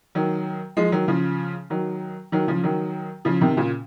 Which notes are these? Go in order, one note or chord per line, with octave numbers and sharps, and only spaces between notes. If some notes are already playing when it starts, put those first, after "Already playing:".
D#3 F#3
F3 G#3
D#3 F#3
C#3 F3
D#3 F#3
D#3 F#3
C#3 F3
D#3 F#3
C#3 F3
C3 D#3
A#2 C#3